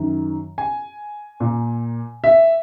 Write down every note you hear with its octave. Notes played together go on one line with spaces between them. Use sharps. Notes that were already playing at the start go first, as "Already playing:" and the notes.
Already playing: F#2 D#3
G#5
A#2
E5